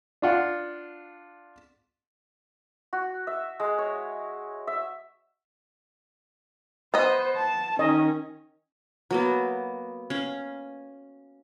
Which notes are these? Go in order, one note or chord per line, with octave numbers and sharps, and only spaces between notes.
D4 F4 F#5
F#4
E5
G#3
C#5
E5
B3 C5 D#5
A5
D#3 C#4 D#5
F#3 A#3 B3
C#4 F5